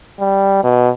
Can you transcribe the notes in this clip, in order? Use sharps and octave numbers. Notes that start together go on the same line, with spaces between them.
G3
B2